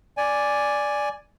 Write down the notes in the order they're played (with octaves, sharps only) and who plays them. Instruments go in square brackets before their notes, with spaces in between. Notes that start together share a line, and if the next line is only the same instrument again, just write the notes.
[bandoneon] D5 G#5